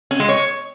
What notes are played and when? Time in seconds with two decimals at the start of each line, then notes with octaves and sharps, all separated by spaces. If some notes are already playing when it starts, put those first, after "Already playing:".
0.11 C#4
0.20 G#3
0.29 C#5